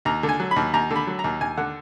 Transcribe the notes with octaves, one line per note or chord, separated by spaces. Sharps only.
D#2 A#5
D3
G#5
F#3
B5
D#2
D#2 A#5
D3
B5
F#3
A#5
D#2
D#2 G#5
D3 F#5